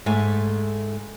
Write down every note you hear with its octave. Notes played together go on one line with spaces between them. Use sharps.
G#2 A3 E5 G#5